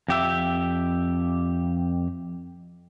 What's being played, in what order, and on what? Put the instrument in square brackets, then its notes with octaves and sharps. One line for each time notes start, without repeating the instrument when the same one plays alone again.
[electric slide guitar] F2 G4 E5